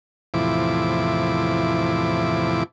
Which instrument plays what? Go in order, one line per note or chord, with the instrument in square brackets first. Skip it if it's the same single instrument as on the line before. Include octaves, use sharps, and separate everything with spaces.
[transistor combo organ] E2 A2 C3 F3 E4 D6